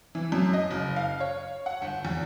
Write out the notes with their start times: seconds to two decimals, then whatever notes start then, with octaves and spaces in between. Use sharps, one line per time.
0.15 E3
0.32 F#2
0.53 D#5
0.70 F#1
0.96 F5
1.20 C#5
1.66 F#5
1.82 G1
2.05 E2